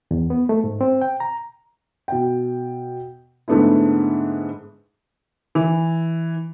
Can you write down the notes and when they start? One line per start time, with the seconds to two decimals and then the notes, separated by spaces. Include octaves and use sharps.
0.11 E2
0.30 B3
0.49 A3
0.64 G#2
0.81 C4
1.02 G5
1.20 A#5
2.08 B2 G5
3.48 G#2 D3 A3 B3 D4 E4
5.55 E3